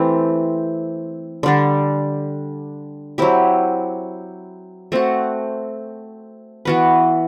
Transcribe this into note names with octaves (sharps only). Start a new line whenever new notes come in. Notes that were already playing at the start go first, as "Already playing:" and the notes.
Already playing: E3 A3 C4 G4
D3 G3 D4
F#3 C4 E4 G4
A3 C4 F#4
E3 B3 F#4 B4